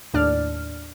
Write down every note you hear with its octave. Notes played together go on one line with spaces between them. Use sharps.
D#2 A2 D4 D5 F6